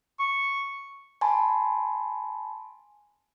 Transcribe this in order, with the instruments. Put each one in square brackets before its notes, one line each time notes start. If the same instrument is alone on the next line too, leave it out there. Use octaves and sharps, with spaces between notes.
[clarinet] C#6
[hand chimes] G#5 A5 B5 C6